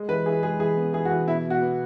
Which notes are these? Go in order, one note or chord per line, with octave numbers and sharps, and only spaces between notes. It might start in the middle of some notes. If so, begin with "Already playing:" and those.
Already playing: G#3
E3 B4
E3 G#4
G#3 G#4
E3 G#4
B3
E3 G#4
F#4
E3
B2 E4
B2
F#4
B3